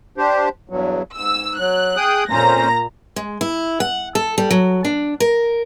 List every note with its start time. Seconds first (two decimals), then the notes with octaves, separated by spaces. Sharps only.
0.18 D4 G4 C5
0.70 E2 G2 F#3
1.15 G#2 E6
1.58 F#3 F#6
1.96 G#4 G5 D#6
2.30 F2 A#2 C#4 C5 A#5 A#6
3.16 G#3
3.41 E4
3.80 F#5
4.15 A4
4.38 G3
4.51 F#3
4.85 D4
5.20 A#4